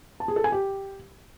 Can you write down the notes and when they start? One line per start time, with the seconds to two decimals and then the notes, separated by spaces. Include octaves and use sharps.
0.20 A5
0.28 G#4
0.36 A4
0.44 G#5
0.52 G4